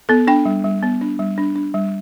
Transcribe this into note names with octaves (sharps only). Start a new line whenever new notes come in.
B3 A4
D4 G5
G3
G3
B3
D4
G3
D4
D4
G3